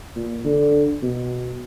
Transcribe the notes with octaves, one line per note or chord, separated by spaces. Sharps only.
A#2
D3
B2